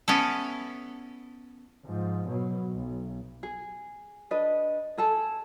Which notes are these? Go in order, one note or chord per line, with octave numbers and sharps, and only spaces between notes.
B3 C#4 E4 A4
G#2 F3
B2 F#3
B1
G#4
D4 B4 D#5
G#4 A4 A5